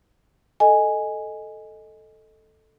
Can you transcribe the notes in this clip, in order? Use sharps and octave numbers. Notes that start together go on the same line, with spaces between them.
A4 D#5 G#5